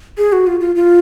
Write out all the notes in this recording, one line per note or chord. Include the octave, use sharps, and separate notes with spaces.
G#4
F#4
F4
F4
F4